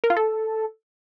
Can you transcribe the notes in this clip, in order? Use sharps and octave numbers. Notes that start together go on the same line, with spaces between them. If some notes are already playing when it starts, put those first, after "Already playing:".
A#4
F4
A4